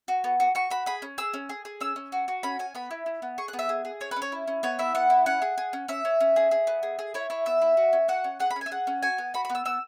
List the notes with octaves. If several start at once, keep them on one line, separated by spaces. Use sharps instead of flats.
F#4
B3
F#4
F#4 C#6
F#4 B5
G#4 B5
C#4
G#4 E6
C#4
G#4
G#4
C#4 E6
C#4
F#4
F#4
C#4 B5
C#4 G#5
B3 B5
E4
E4
B3
G#4 C#6
F#6
B3
E5
G#4
G#4
C#4 C#5
B4
C#4
C#5
E4
C#4
B3 C#5
E4 E5
B3 F#5
E4
C#4 F#5
G#4
G#4
C#4
C#4 E5
C#4
C#4
G#4
G#4
B3
G#4
G#4
E4 C#5
E4 C#5
B3 E5
E4
F#4
C#4
F#4 F#5
C#4
G#4 F#5
B5
C#4
E5 G#5
G#4 F#5
C#4
F#4 G#5
B3
F#4 B5
B5
B3
E6
B3 E6